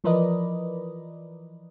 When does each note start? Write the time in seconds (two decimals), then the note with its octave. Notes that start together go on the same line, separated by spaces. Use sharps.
0.04 E3 F3 A#4 B4 D5 D#5